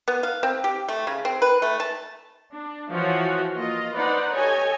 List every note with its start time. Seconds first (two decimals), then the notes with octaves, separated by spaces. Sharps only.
0.08 B3
0.23 F5
0.43 C4
0.64 G4
0.88 A3
1.07 C#3
1.25 C4
1.42 B4
1.62 A3
1.80 A5
2.52 D4
2.92 E3 F3 F4 F#4 C#5
3.55 A#3 F4 D#5
3.95 D#4 B4 C5 D5 F#5
4.33 G4 A4 C#5 D#5 G#5